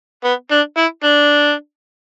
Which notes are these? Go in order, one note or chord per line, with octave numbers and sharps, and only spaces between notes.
B3
D4
E4
D4